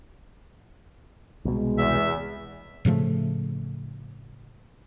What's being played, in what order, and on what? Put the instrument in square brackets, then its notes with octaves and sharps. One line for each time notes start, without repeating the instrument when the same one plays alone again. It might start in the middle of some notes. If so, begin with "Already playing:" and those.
[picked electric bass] C2 B2 [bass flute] G#3
[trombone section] E2 [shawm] E5
[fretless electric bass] A2 C#3 F3 A3